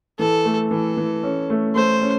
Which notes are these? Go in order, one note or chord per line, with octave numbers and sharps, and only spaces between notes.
E3 A4
A3
E3 A4
E3
C#4
A3
A3 C5
C#4